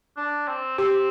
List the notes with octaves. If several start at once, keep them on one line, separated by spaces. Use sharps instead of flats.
D4
C4
C4 G4